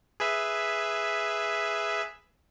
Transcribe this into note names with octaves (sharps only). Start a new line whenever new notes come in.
G#4 B4 E5